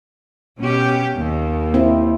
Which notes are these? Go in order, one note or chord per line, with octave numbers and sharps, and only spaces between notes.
B2 C#4 G4
D#2
C4 E4